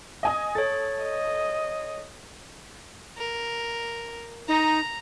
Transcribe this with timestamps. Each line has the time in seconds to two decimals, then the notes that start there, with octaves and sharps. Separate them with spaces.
0.23 D#5 G#5 D#6
0.55 A4 C#5 A6
1.03 D#5
3.17 A#4
4.48 D#4 A#5